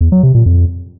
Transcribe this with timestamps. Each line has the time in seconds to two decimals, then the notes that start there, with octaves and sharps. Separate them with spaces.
0.01 E2
0.12 F#3
0.23 C3
0.35 A#2
0.46 F2